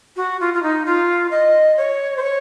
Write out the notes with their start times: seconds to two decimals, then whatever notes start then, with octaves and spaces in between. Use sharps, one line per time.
0.16 F#4
0.40 F4
0.54 F4
0.63 D#4
0.86 F4
1.31 D#5
1.77 C#5
2.17 C5
2.22 C#5